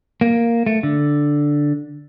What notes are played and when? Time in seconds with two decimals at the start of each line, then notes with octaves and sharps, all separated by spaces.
0.21 A#3
0.66 A3
0.83 D3